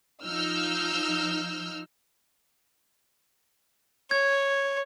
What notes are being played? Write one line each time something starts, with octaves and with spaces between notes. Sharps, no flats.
F3 D#4 E6 F6 G6
C#5 G#6